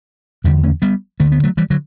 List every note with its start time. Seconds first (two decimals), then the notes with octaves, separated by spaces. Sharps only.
0.44 E2 D3 E3 G3
0.64 A3 C#4
0.82 G3 B3
1.20 D2 D3 A3
1.32 B3
1.44 F#3 A3
1.57 E3 G3
1.70 D3 F#3